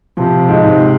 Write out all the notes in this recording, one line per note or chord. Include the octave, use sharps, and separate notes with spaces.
C3 F3
G#2
C3